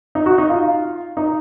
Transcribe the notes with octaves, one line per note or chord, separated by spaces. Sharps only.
D#4
F#4
D#4
F4
D#4